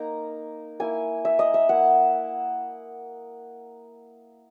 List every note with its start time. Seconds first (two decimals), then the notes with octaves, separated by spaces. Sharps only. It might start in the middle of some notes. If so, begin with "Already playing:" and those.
Already playing: A#3 D#4 A#5
0.80 A#3 E4 G#5
1.25 E5
1.39 D#5
1.54 E5
1.69 A#3 E4 F#5